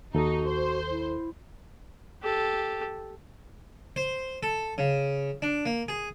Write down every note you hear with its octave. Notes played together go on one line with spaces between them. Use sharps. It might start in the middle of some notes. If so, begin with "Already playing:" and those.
D#2 D#4 F#4 A4
C5
E4
G4 A4
C5
A4
C#3
D4
A#3
G#4